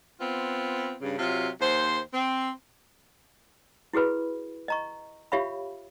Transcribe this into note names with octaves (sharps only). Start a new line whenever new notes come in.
B3 C4 F4
G2 C#3
C3 F#3 F4
D#2 C5
C4
E4 F#4 G#4 B4 B5
D#5 A#5 C#6
F4 G4 C#5 E5 F5 B5